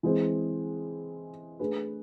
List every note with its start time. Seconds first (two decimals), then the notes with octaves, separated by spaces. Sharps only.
0.03 E3 G#3 C4 G#4 C5
1.59 A3 D4 G#4 B4